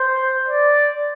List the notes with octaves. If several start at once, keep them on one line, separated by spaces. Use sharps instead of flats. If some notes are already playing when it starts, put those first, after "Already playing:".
Already playing: C5
D5